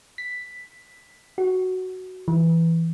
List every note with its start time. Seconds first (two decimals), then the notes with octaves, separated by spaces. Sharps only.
0.18 B6
1.38 F#4
2.28 E3